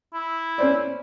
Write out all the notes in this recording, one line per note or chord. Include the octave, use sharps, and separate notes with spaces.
E4
C#4 C5 D5